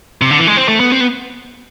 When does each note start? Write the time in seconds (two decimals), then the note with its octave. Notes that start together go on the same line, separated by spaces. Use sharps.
0.22 C3
0.31 D3
0.39 E3
0.47 G#3
0.57 C4
0.68 A3
0.80 B3
0.92 C4
1.01 B3